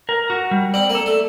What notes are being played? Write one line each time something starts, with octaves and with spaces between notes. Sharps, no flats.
A#4
F#4
G3
C4 D5
A#3
A4
A3